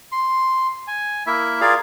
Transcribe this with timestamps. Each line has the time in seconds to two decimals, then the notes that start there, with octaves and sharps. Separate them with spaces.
0.12 C6
0.87 G#5
1.27 A#3 E4 E5
1.61 F4 G#4 A#4 D5 F5